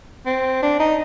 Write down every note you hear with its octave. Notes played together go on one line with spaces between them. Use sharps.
C4
D4
D#4